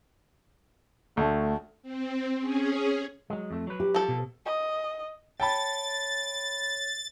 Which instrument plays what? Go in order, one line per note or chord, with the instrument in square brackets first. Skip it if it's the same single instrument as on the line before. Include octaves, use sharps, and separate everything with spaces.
[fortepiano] D2 [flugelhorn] A3
[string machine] C4
C#4 G#4
[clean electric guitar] F#3 G#3
F2 A3
F#3 B4
[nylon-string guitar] G4
[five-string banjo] F3 A4
[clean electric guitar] B2
[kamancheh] D#5
[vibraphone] C#5 [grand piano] G5 A5 B5 [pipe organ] A6